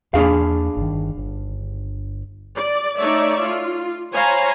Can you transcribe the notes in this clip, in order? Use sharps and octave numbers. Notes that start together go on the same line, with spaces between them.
E2 A#3 D4 G#4 F5
G1 D#3
G1
D5
A3 D#4 A4 C#5 D5 E5
F4
C5 C#5 F5 G#5 A#5 B5